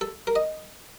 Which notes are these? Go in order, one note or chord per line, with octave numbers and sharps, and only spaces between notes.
A4
A#4
D#5